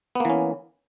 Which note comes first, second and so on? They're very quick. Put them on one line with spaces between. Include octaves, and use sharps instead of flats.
B3 A#3 E3 C#4